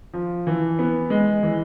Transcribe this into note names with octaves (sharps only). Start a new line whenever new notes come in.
F3
E3
B3
G#3
E3